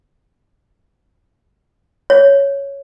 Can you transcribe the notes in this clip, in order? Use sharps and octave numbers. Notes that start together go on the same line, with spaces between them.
C#5